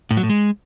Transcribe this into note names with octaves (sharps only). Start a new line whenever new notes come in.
A2
F#3
A2
G#3